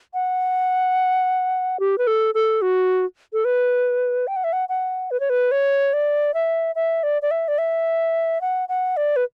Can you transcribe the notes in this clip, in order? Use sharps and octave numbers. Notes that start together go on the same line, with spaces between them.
F#5
G4
B4
A4
A4
F#4
A4
B4
G5
F#5
E5
F#5
F#5
B4
C#5
B4
C#5
D5
E5
E5
D5
D5
E5
D5
E5
F#5
F#5
D5
B4